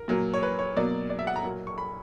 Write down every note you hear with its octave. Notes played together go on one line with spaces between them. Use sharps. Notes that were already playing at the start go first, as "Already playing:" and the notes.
Already playing: A#4
A#2 F#3 A#3
C#5
B4
C#5
B2 F#3 A#3 D5
D5
E5
F#5
A#5
A#2 F#3 A#3
C#6
B5